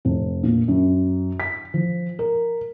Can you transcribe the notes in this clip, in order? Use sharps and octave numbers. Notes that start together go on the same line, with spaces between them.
F1
A#2
F#2
B6
F3
A#4